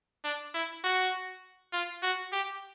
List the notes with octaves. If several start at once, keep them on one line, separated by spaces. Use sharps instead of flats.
D4
E4
F#4
F4
F#4
G4